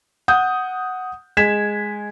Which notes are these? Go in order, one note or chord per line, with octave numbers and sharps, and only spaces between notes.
F#5 D#6 G6
G#3 G#6 B6 E7